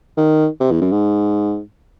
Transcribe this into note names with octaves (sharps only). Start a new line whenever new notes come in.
D#3
C3
E2
F#2
G#2